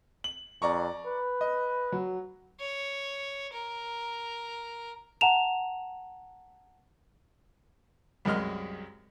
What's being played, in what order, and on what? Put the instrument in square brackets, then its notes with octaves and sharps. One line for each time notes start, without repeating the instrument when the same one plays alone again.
[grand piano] F#7
[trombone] F2 [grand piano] D5 A#5 C#6
[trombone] B4
[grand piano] D#5
F#3
[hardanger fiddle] C#5
A#4
[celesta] F#5 A5 A#5 E7 F7
[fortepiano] C2 F#2 G#3 D#5 F6